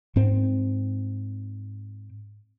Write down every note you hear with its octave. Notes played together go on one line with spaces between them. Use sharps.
G#2 C4